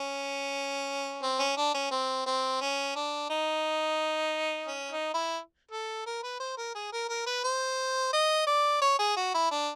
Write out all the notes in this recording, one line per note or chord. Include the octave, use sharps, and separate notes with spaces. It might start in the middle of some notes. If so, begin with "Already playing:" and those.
Already playing: C#4
C4
C#4
D4
C#4
C4
C4
C#4
D4
D#4
C#4
D#4
E4
A4
A#4
B4
C5
A#4
G#4
A#4
A#4
B4
C5
D#5
D5
C#5
G#4
F#4
E4
D4